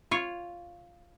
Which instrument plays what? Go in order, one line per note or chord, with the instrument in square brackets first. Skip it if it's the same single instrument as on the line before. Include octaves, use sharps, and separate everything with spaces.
[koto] F4 C#5